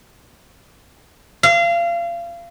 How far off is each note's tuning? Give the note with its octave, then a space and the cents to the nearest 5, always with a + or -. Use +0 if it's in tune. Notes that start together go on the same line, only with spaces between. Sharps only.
F5 -30